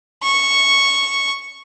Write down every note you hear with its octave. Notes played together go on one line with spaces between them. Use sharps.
C#6